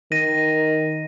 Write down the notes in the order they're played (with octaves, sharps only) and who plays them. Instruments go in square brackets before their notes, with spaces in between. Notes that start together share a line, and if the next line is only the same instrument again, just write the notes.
[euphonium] D#3 [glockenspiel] A#6 D#7